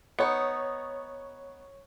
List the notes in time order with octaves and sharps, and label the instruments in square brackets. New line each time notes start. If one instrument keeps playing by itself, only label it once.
[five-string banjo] B3 D#4 [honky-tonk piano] C#5 C#7